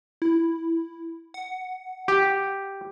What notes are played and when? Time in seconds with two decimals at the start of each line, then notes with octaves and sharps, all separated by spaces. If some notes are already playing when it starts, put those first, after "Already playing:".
0.22 E4
1.34 F#5
2.08 G4